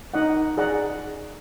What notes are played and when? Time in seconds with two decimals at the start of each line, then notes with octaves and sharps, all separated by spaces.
0.14 D#4 D#5 F#5
0.57 G#4 D5 F#5 A#5